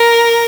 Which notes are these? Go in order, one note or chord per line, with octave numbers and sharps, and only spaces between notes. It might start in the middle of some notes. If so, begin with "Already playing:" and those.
Already playing: A#4